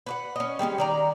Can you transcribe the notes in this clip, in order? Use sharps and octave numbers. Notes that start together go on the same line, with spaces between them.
B4 C#5 F#5
C#4 D#5
G3 G#3 B3 C#4
D#3 D5 A#5